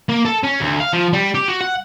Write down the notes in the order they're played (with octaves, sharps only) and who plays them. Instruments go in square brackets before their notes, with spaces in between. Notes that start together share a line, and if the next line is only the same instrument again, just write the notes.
[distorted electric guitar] A#3
A4
C#4
D2
F5
F3
G3
G4
F#4
F#5